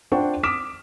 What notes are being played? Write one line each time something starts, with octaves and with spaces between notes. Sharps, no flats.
D4 F4 C5 F#5 G5 C#6
D6 D#6 F6 B6 D7 E7